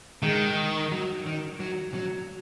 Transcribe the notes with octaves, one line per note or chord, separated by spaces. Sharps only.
D#3 G#3
F#3
D#3
F#3
F#3